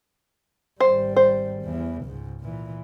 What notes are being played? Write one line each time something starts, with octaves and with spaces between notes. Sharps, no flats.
G#1 G3 C5
C5
E2 E3
C#2 G#2
A#2 E3